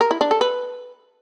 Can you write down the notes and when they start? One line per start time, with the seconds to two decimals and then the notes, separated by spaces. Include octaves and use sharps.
0.01 A#4
0.11 E4
0.21 D4
0.31 A4
0.41 B4